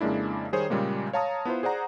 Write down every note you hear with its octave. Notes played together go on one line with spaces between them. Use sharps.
F2 C#3 G#3 A#3 D4 E4
D#3 G3 G#4 C5 C#5
A#2 C#3 G3 G#3 A#3
C#5 F5 A5 A#5 D#6
B3 E4 F4 C5
G#4 C5 D5 F#5 A#5